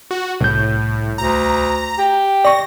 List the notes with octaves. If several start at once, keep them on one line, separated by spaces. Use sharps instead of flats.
F#4
C2 A2 G6
D2 A#5
G4
D5 C#6 A#6